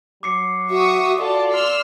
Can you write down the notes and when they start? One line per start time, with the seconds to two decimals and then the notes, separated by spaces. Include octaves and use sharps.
0.23 F#3 D6 C7 C#7
0.70 F#4 E5 C#6 D#6
1.19 F4 F#4 A4 D5 A5
1.52 C6 E6 F6 C7